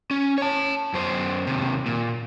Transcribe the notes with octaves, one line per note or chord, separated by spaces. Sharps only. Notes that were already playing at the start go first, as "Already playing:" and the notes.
C#4
C#5 A5
F#2 C5
D#2 C3
A#2